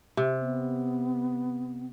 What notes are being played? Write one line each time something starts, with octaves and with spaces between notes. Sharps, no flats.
C3
B3